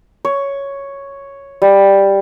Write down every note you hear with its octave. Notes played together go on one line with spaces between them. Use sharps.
C#5
G3